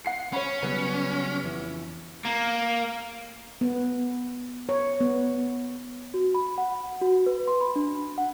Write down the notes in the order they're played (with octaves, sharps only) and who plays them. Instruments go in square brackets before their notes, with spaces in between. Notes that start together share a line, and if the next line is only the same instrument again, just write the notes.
[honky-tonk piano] F#5 C7 C#7
[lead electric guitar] C#4 [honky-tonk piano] C#5 B5
[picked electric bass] C#3 F#3 G3 [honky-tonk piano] B3
[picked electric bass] F2 E3
[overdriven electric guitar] A#3
[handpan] B3
C#5
B3
[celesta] F#4
B5
F#5
F#4
B4
C6
B5
D4
F#5